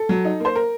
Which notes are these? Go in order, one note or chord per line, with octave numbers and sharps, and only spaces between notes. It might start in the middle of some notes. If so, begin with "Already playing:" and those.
Already playing: A4
F#3
D#4
A#3 C5
A#4